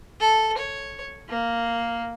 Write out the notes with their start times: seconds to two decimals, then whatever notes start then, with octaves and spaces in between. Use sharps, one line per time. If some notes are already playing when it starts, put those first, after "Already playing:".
0.20 A4
0.58 C#5
1.29 A#3